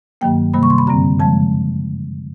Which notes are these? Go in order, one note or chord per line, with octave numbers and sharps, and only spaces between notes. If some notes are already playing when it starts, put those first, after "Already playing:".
G2 D#3 F#3 A#3 G5
C3 D#3 G3 A#3 B5
C#6
C6
B5
F#2 D3 G3 C4 A#5
C#3 F3 G#3 A5